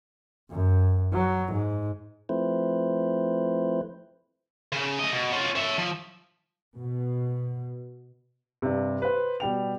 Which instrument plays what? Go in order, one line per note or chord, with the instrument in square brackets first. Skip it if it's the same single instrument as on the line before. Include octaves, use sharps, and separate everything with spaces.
[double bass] F#2
F#3
G#2
[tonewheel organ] F3 A3 C4 E4 B4 C5
[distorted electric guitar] C#3
A3 D#5
B2
C#4 F4
C#5 E5
F3
[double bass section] B2
[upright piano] G2 C3
B4 C5
B2 G3 G5 F7